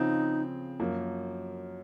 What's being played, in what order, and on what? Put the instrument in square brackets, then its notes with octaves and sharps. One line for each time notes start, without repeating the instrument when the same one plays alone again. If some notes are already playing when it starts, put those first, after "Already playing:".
Already playing: [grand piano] C#3 F3 C4 F4 [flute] D#4
[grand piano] F#2 F3 A#3